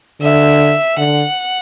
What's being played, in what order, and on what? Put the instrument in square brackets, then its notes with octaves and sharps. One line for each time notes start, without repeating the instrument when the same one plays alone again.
[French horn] D3 [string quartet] E5
[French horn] D3 [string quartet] F#5